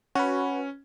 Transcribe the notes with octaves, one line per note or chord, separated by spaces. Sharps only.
C#4 F#4 B4